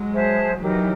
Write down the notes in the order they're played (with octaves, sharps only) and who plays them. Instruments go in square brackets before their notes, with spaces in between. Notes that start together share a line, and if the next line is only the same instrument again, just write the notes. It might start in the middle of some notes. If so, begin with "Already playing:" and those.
Already playing: [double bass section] F#3 G#3
[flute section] G#4 C5 E5 A5
[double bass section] E3 F#3 [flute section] D#4 G4 A#4